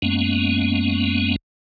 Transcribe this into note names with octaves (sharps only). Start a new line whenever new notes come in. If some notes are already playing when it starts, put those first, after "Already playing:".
F#2 G#3 A#3 B3 C#4